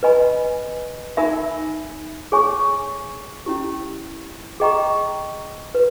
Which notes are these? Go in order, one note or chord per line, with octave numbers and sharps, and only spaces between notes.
B4 D#5 G#5 B5
D#4 A#4 E5 G#5 B5
G#4 C#5 G#5 C#6
C#4 E4 G4
G#4 D#5 G5 A#5 C#6
B4